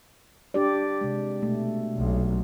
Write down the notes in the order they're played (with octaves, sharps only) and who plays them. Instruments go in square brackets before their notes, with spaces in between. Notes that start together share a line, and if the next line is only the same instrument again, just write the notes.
[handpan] D4 G4 D5
C3 G#3
B2 A3
[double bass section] B1